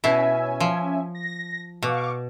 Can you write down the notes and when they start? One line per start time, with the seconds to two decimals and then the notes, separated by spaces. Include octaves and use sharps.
0.04 B2 C#4 E4 E5 G#5
0.60 F3
1.15 A#6
1.83 B2 F5 C#6 D6